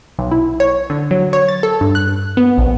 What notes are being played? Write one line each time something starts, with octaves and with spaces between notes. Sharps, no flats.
B1
E4
C#5
D3
F#3
C#5
A6
A4
G2
F#6
B3
A#1